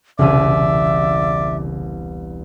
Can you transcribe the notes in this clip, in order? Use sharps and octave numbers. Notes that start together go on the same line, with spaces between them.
E1 C2 C#3 D5 E5 D#7